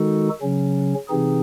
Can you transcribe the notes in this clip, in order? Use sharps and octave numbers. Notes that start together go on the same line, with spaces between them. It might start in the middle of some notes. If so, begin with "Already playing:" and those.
Already playing: D#3 G#3 D#4 F#4 A4
C#3 F#3 C#4
C3 E3 C4 D#4 G#4